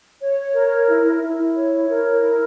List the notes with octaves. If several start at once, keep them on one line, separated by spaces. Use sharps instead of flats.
C#5
A#4
E4
E4
C#5
A#4
E4